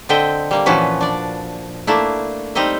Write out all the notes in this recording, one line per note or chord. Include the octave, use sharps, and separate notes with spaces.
D3 C4 D#5 E5 G5
G3 A#3
A#2 E3 F3 C#4 F#4 B4
D4 D5
A3 A#3 D4 E4
G3 C4 D#4 D#5 E5